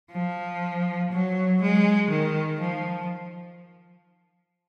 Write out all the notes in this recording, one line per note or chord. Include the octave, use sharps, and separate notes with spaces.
F3
F#3
G#3
D#3
F3